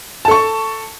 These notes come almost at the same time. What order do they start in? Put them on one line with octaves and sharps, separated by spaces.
A5 A4 C#6